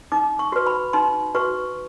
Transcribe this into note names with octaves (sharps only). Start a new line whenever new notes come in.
D#4 D6
C#6
F#4 B4
B5
D#4 C6
F#4 B4 C#6